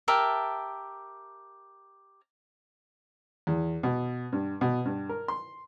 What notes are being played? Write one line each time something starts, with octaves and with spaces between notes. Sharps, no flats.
G4 A#4 E5 A5
E2
B2
G2
B2
G2
A#4
C6